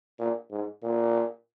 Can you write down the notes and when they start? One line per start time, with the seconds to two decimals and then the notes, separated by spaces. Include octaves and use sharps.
0.19 A#2
0.51 G#2
0.83 A#2